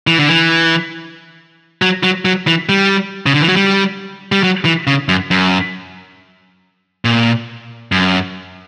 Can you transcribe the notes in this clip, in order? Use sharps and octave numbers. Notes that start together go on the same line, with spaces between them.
E3
D3
E3
F#3
F#3
F#3
E3
G3
C#3
D3
E3
F#3
G3
G3
F#3
E3
C#3
F#2
F#2
A#2
F#2